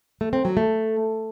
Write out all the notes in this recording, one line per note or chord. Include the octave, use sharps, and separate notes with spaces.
A3
C4
F#3
A3